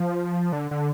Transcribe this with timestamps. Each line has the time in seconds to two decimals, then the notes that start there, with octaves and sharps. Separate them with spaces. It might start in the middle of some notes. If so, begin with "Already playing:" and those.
Already playing: F3
0.52 D3
0.71 D3